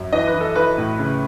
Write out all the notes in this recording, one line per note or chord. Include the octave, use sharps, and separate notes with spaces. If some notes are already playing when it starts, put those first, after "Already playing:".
Already playing: F#2
E3 D#5
B4
E3
A4
E3 B4
A2
C#3